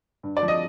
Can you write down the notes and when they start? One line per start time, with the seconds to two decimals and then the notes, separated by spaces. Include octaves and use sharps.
0.23 G2
0.37 D5
0.43 F3
0.48 D#5